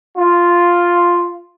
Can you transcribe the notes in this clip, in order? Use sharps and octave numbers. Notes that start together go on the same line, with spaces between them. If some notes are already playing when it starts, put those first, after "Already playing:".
F4